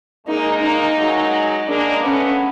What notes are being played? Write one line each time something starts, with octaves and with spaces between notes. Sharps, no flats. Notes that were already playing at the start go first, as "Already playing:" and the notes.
G#3 A#3 D#4
D#4
F#3 G#3
G#3 A#3 D4
A3 B3 C#4